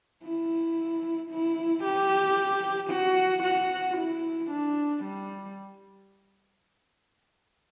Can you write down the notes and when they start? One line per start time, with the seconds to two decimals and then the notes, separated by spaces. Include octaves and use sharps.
0.23 E4
1.30 E4
1.84 G4
2.90 F#4
3.43 F#4
3.97 E4
4.50 D4
5.03 G3